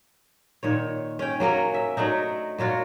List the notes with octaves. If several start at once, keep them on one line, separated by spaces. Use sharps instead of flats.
A#2 D#3 C#5
C#4 G5
F#3 A#3 C#4 A#4
E5
F#3 A3 D4 D#4
A#2 F#3 F4 F#4